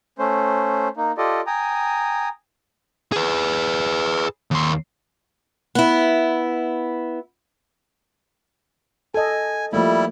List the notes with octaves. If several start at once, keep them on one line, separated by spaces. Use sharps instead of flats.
A3 C#4 C5
A#3 D#4
F4 G4 A4 D5 D#5
G5 G#5 A#5 D#6
G#4 B4
D#2 C6
B3 E4
A4 D#5 G#5
F3 G3 A3 A#3 E4